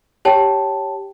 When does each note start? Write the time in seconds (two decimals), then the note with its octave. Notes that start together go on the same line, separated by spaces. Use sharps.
0.25 G4 C#5 G5 A5